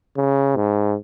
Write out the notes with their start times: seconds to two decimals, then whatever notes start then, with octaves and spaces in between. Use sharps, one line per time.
0.17 C#3
0.56 G#2